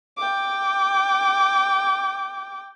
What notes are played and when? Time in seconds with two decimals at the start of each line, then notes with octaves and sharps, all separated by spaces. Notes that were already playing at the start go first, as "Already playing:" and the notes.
0.18 G5 D6